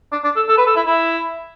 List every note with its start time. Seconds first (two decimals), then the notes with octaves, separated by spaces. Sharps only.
0.12 D4
0.24 D4
0.36 A4
0.49 A4
0.58 B4
0.67 A4
0.76 E4
0.86 E4